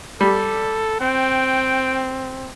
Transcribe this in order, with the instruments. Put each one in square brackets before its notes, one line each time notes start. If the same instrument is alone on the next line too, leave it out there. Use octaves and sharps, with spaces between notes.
[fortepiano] G3 [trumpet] A4 [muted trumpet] D5
[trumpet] C4 [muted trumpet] G5